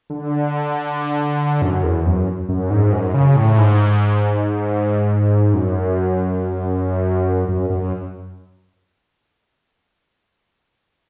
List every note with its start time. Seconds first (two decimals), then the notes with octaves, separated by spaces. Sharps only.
0.10 D3
1.62 F#2
1.84 E2
2.06 F#2
2.49 F#2
2.70 G#2
2.92 F#2
3.14 C#3
3.36 A2
3.58 G#2
5.54 F#2
7.49 F#2
7.70 F#2